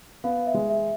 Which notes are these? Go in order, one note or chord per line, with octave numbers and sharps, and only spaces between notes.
B3 F5
E5
G#3
E5